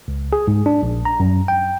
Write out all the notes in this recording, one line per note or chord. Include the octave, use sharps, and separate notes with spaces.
C#2
G#4
G#2
D4
A#1
A#5
F#2
G5